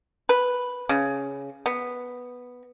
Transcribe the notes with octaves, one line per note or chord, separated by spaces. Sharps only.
B4
C#3
B3